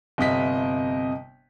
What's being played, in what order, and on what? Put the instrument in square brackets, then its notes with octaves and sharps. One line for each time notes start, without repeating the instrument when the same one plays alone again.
[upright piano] G1 C3 D#5 B6